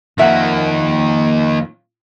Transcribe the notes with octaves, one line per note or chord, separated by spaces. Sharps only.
F2 D#3 A#3 E5 F#5